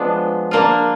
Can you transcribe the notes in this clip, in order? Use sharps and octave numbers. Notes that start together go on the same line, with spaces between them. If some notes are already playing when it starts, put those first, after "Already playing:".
Already playing: F3 G#3 B3 D4
A#3 D4 F4